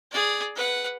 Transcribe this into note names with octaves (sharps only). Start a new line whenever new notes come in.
G#4 D5
B4 F#5